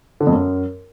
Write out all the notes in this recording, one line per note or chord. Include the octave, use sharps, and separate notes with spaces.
D3
F2
F#2